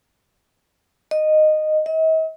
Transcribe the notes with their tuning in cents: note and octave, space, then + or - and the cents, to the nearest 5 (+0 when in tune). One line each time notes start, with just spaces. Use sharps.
D#5 -10
D#5 +45